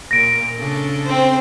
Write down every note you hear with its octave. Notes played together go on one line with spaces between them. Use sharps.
A#2 A#4 A#6 D7
C#3 D4 A4
C4 C5